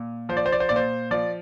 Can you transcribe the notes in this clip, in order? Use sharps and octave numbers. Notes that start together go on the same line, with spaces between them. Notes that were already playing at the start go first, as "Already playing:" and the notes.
Already playing: A#2
F3 C5
D5
C5
D5
C5
A#2 D5
C5
F3 D5